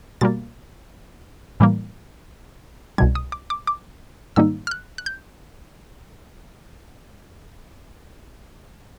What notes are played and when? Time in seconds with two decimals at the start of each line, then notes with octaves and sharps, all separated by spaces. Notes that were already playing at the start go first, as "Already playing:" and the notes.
0.21 B2 G3 A#3 A6
1.60 A2 E3 G3 A#3
2.98 C2 B2 G3 G#6
3.15 D#6
3.32 D6
3.50 D6
3.67 D6
4.36 G#2 D#3 G3 A#3 D#4 E6
4.67 F6
4.71 F#6
4.98 F#6
5.06 G6